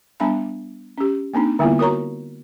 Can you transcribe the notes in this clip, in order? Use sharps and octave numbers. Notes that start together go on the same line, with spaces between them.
G3 B3 D4 F5 A5 B5
C#4 G4
A#3 C4 D4 D#4
D3 G3 A#3 B3 E4 F4
F#4 A#4 C#5 A#5 C#6